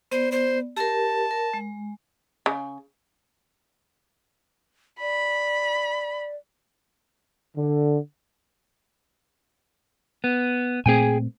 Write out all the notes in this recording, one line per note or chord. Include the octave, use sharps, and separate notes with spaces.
B3 C5 D5
C5
G4 A#4 A5
A#4
G#3
C#3
D5 B5
D3
B3
A#2 A3 C4 G#4 G5 G#5